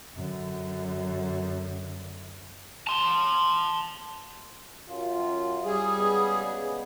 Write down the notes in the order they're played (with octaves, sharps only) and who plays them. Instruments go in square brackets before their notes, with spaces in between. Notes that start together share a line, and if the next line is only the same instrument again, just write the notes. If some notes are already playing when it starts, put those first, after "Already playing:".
[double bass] F#2 D3
[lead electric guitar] A5 C6
[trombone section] F#2 F4
[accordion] G3 G#4
[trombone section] C#3 G#3 B3